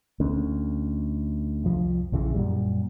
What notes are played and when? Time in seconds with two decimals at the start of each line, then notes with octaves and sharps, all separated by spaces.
0.20 D2 C#4
1.64 C2 F2 F3
2.12 A#1 F2 C#3 E3
2.34 F#2 A#2 G3